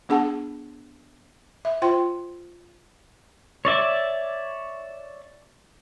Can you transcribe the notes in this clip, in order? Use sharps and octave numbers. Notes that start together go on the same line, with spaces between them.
B3 D4 G#4 F#5 A5
E5
F4 C5 G5 C6
C#5 D5 E5 D6